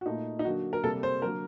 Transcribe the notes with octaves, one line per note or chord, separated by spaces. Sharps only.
F#4
A#2 A3 D#4
D#4
D3 F#3 A#3 F#4
A#4
C3 G3 A#3 A4
C5
D3 F#3 A#3 A#4